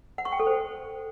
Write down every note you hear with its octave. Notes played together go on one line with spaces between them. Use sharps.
F#5
C#6
G5
A4
C5